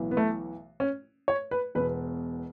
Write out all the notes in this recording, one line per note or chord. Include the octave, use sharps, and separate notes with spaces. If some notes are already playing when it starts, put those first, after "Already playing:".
Already playing: B1 A2 E3
B3
A3
C#4
C#5
B4
E1 B2 B4